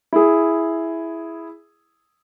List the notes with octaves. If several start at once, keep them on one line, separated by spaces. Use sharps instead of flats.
E4 G#4